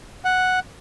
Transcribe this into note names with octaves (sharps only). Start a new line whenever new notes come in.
F#5